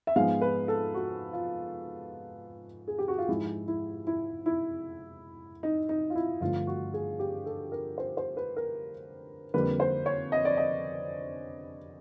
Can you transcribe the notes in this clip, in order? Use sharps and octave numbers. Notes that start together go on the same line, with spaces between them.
E5
G#2 F3 G#3 B3 F5
B4
A4
F#4
F4
G#4
G4
F#4
F4
G#2 F3 G#3 E4
E4
E4
E4
D#4
D#4
F4
E4
G2 D3 F3 A3 F4
F#4
G#4
G4
A4
A#4
C5
C5
B4
A#4
F2 D3 G3 A#3 B4
C5
C#5
D#5
D5
D#5